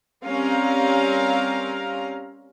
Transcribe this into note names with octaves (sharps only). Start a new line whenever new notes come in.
G3 C4 C#4 A#4 F5 A#5